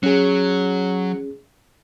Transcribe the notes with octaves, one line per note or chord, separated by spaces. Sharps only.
F#3 C#4 G#4